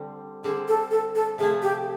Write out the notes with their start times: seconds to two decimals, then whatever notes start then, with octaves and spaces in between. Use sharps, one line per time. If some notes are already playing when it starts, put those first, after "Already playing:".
Already playing: D3 G3 C4
0.44 D3 G3 C4 G#4
0.68 A4
0.91 A4
1.15 A4
1.38 C3 F3 A3 G#4
1.62 G4